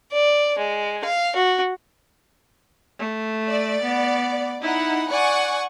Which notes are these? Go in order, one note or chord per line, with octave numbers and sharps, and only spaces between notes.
D5
G#3
F5
F#4
A3
D5
B3
D#4 E4 F#5
D5 F#5 G#5 C#6